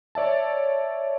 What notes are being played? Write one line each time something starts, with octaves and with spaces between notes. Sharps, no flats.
C#5 D5 E5 A5